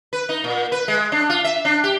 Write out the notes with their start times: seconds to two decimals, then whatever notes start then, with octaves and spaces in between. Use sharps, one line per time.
0.13 B4
0.29 D#4
0.44 A#2
0.72 B4
0.88 G#3
1.12 D4
1.30 F4
1.44 E5
1.65 D4
1.84 G4